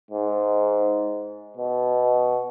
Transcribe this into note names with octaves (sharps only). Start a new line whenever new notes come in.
G#2
B2